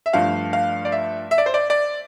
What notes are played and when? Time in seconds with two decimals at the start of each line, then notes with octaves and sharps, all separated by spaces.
0.06 E5
0.13 G2 F3 A3 F5
0.53 F5
0.85 D5
0.92 E5
1.31 E5
1.38 D5
1.46 C5
1.54 D5
1.70 D5